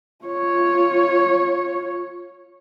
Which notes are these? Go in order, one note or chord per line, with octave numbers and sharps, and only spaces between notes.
F4 C#5